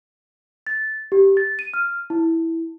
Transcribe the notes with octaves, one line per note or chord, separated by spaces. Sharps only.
A6
G4
A6
D#7
F6
E4